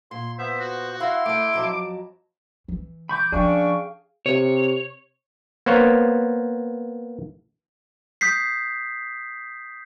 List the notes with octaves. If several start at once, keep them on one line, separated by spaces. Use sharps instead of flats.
A#2 C6
B3 C5 E5
F#4
E4 F5 F#5 C6
A3 D#5 D6
F2 F#3 A5
E3
B5 C#6 D6 G6
F3 C#4 D4 G#4 F5 G5 C#6
C3 C#5
A#3 B3 C5 C#5
D#6 G6 B6 C7